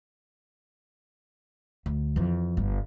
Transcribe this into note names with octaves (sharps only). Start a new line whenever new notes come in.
D2
F2 E3
G1